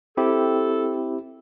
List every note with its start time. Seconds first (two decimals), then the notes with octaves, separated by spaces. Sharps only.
0.17 C4 E4 G4 A4